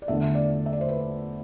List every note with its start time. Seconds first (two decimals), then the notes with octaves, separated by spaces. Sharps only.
0.02 D5
0.08 E2 D3 A3 E5
0.35 D5
0.66 E5
0.73 D5
0.81 C5
0.89 B4